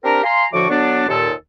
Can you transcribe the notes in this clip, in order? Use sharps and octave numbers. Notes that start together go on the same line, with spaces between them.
C4 D4 G4 A#4
F5 G#5 A#5 C6
A2 D3 F3 F#4 C#6 D6
D3 F#3 B3 D4
D#2 A#2 A4